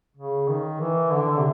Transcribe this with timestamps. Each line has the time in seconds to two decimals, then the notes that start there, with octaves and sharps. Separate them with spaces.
0.17 C#3
0.48 D#3
0.80 E3
1.12 D3
1.38 C3